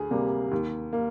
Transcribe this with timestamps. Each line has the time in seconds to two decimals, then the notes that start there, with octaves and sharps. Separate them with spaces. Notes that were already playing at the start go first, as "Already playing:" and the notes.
Already playing: D2 G#4
0.11 C3 G3 A#3
0.51 D#2
0.93 A#3